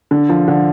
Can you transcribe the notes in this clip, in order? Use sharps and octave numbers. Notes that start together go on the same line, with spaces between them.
D3
F3
D3